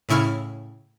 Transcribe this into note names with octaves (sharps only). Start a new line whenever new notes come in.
A2 C#3 E4 C#6 F6